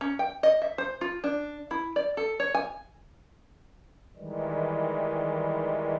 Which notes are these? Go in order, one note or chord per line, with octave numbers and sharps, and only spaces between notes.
C#4
G5
D#5
E5
C5
F4
D4
E4
D5
A4
C#5
G#5
D#3 E3 G3 G#3